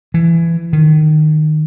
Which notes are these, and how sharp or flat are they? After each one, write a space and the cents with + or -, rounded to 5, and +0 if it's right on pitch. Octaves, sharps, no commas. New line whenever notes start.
E3 +20
D#3 -20